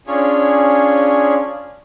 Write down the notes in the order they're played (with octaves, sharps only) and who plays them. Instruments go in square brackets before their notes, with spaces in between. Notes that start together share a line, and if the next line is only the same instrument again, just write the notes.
[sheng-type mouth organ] C#4 D4 F4 G#4 C#5